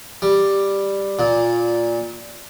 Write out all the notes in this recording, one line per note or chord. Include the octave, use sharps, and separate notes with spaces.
G3
A#2